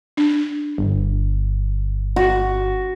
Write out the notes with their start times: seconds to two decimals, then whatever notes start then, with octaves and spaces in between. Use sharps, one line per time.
0.17 D4
0.78 G1
2.16 F#4